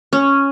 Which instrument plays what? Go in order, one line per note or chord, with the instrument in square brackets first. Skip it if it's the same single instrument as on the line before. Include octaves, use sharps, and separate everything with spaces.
[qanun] C#4